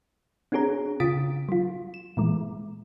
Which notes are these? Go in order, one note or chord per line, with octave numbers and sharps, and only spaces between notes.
C4 D4 F#4 G#4 C#5 A#5
C#3 F4 D#6 A6 B6 D7
F#3 F4
E7
A#2 E3 G#3